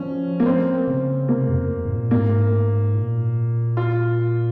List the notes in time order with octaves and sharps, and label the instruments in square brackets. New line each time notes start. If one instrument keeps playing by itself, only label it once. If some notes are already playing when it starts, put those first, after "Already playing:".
Already playing: [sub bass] F3 [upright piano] C#4
[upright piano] A#3
C4
[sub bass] C#3
[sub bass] C3 [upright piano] A#3
[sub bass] F2
G#2
A#2
[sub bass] G#2 [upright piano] A#3
[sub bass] A#2
[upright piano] F4